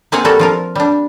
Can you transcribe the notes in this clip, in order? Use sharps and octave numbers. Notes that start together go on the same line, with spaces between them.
A#3 C4 G#4 F5 F#5 G#5
G3 A#3 F#4 A4
F3 F4 A#4
G3 D4